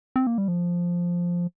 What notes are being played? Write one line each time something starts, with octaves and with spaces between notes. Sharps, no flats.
C4
A#3
G3
F3